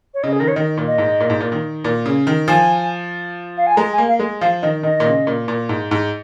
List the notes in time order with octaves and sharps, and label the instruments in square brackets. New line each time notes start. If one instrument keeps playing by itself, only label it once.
[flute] C#5
[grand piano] C#3 [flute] D#5
[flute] G#4
[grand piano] D#3 [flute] A#4
[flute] C#5
[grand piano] D#3 [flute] D#5
[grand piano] A#2
[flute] D#5
[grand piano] G#2
A#2
G#2
A#2
D#3
A#2
C#3
D#3
[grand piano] F3 [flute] G#5
[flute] F5
G#5
[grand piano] G#3 [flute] A#5
[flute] G#5
[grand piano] A#3
[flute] F5
[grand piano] G#3
[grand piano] F3 [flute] F5
[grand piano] D#3 [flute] D#5
[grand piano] D#3 [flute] D#5
[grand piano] A#2
C#3
A#2
A#2
G#2
G#2